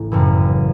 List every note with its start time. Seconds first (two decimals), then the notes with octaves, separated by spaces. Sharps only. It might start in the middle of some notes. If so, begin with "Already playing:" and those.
Already playing: A1 A2 A3
0.12 F#1 F#2 E3